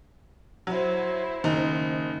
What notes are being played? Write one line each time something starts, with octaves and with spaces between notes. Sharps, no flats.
F#3 E4 C5
F#1 D#3 D#4 D#5